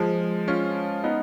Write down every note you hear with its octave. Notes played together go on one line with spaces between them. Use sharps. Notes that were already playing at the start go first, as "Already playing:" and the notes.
Already playing: F3 G#3
C#4 F4
B3 D#4